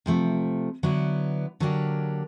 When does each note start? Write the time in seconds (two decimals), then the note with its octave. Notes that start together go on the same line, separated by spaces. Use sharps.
0.06 C3 F3 A3
0.83 D3 F#3 B3 E4
1.60 D3 F#3 A#3 D4 G4